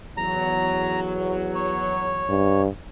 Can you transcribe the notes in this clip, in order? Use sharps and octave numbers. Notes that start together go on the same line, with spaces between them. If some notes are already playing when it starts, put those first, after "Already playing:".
E2 F#3 A#5
C#5
G2